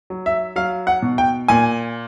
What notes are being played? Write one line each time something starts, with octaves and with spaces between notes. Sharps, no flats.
F#3
E5
F#3 F5
F#5
B2
G5
A#2 G#5